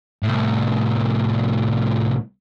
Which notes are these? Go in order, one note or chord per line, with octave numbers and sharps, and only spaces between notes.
C2 A2